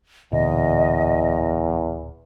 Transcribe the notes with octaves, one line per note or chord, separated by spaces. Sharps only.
D1 E2 A#2 D3 D#5